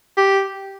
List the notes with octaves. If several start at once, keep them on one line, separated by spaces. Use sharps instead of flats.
G4